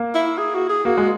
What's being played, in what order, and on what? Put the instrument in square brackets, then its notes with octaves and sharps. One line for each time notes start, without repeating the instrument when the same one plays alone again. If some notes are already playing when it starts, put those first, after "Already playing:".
Already playing: [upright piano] A#3
[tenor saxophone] E4
G#4
F#4
G#4
[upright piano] A#3 [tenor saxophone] F#4
[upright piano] G#3